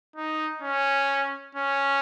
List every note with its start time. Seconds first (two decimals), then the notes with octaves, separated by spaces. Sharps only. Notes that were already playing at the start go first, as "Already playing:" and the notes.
0.16 D#4
0.62 C#4
1.55 C#4